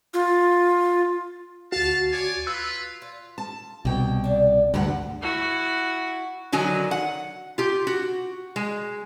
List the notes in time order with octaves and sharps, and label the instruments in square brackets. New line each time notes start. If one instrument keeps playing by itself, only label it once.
[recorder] F4
[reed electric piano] D2 F#4 [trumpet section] F5 A5
[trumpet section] C#5 D5 G#5
[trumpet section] F4 B4 [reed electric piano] E6
[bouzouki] F4
[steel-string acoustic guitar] A5
[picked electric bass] C2 [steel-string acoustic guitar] B2 G5
[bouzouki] D4 D5
[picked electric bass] D2 [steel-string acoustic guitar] G2 A#4 F#5 [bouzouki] C3 G3 F4
[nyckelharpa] E4 F#4
[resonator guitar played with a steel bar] D3 D#3 F#3 G#5
F#5
F4 G4
F#4
G#3